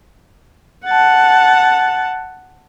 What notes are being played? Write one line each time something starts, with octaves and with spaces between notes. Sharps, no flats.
F#5 A5